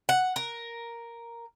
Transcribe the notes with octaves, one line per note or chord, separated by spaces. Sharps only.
F#5
A#4